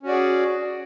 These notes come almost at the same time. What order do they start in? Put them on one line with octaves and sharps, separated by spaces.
C#4 F#4 D5 G#4